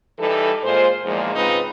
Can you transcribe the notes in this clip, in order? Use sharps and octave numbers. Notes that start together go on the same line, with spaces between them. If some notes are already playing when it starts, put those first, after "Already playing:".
E3 G3 D#4 A4
A#2 G#3 F4 C5
E2 A#2 D#3 F3 G#3
G#2 C#3 C4 D#4 F4 B4